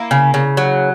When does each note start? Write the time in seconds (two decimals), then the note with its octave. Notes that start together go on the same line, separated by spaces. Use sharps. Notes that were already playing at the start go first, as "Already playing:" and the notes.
Already playing: A#3 E4
0.11 C#3
0.34 C#3
0.57 F#3